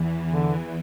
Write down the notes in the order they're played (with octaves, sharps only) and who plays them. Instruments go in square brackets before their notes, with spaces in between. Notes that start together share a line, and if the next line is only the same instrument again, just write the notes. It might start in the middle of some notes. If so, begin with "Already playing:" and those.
Already playing: [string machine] E2 E3
[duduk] D3